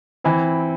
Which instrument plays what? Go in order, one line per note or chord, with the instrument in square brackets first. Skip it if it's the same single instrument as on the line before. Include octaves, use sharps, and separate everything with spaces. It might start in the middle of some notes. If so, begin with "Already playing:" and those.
[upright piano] E3 [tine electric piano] C4 E4